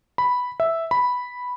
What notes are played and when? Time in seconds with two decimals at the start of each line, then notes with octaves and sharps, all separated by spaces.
0.18 B5
0.60 E5
0.91 B5